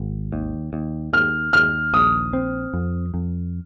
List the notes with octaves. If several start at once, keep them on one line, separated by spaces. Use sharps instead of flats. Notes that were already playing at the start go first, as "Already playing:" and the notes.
Already playing: G#1
D#2
D#2
D#2 F6
D#2 F6
A#1 D#6
C4
F2
F2